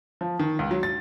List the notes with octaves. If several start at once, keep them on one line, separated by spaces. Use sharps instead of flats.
F3
D#3
C#2
F#3
A6